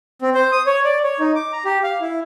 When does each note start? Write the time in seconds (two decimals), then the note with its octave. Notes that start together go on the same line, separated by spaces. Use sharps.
0.22 C4
0.35 C5
0.52 D#6
0.66 C#5
0.84 D5
1.03 C#5
1.19 D#4
1.35 D6
1.53 A#5
1.65 G4
1.83 F5
2.01 E4